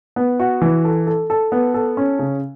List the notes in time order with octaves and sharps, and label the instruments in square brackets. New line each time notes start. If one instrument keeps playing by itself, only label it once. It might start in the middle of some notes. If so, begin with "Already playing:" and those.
[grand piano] B3
F#4
E3
A4
A4
A4
B3
A4
C#4
C#3